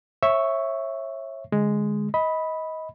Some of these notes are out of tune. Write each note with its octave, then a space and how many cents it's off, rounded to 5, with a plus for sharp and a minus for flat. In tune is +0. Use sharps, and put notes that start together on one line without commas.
C#5 -30 E5 +0 C#6 +0
D3 +0 G#3 +0
D#5 +25 B5 -5